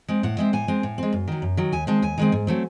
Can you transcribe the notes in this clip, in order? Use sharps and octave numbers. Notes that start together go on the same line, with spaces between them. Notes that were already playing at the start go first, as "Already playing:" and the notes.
G#3 C4
A2 F#5
G#3 C4 E5
A2 G#5
G#3 C4
A2
G#3 C4
F#2
D#3 F#3
F#2
D#3 F#3
D#2 G#5
D#3 G#3 C4 A5
D#2 G#5
D#3 G#3 C4
G#2
F#3 A3 C4